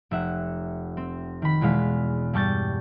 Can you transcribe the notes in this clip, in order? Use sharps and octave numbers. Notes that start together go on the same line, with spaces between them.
F1 E5 F#5
C4
D#3 B5
E2 B2 G#3 F5 B6
G2 G3 A5 C#6 G6 A6